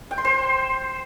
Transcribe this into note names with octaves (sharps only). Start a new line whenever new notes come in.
G5
C6
C5